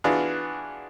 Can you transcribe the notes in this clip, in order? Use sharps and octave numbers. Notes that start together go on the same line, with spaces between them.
E3 B3 D4 F4 F#4 G#4